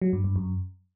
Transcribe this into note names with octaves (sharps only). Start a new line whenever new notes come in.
F#3
G2
G2
F#2